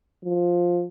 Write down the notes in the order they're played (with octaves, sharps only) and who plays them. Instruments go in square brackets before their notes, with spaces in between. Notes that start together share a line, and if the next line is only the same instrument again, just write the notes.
[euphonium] F3